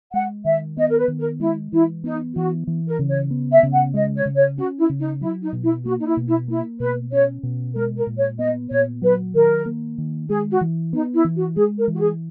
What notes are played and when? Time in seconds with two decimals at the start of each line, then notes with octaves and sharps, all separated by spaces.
0.13 G#3 F#5
0.45 D#3 E5
0.77 B3 D#5
0.89 A#4
0.98 B4
1.08 D#3
1.19 A#4
1.40 G#3 E4
1.72 E3 E4
2.04 B3 D#4
2.35 E3 F#4
2.67 E3
2.88 A#4
2.99 C#3
3.09 C#5
3.31 B3
3.52 E5
3.63 C#3
3.73 F#5
3.94 G#3 D#5
4.15 C#5
4.25 C#3
4.36 C#5
4.57 C#4 F#4
4.78 E4
4.89 C#3
5.00 D#4
5.21 F#3 E4
5.42 D#4
5.53 B2
5.63 E4
5.85 A#3 F#4
5.99 D#4
6.06 E4
6.17 B2
6.28 E4
6.48 A#3 E4
6.80 B2 B4
7.12 C#4 C#5
7.43 B2
7.75 G#3 A#4
7.96 A#4
8.07 A#2
8.18 C#5
8.38 B3 D#5
8.70 A#2 C#5
9.02 F#3 B4
9.34 D#3 A#4
9.66 A#3
9.98 D#3
10.29 G#3 G#4
10.51 F#4
10.61 E3
10.93 B3 D#4
11.14 E4
11.24 E3
11.35 F#4
11.56 G#3 G#4
11.78 A#4
11.88 E3
11.94 F#4
11.99 G#4